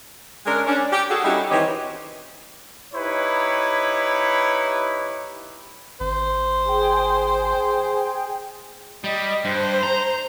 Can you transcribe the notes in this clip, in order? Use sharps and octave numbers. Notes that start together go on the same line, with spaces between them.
G#3 C#4 D4 A#4
C#4 D4
G4
F#4 G#4 A4
G3 C#4 D#4 E4 F#4 G4
D#3 E3 C4 G4 C#5 D#5
D#4 E4 G4 B4 C#5
G#1 C5
G#4 G5
G3 D#5
G2 C5
A#5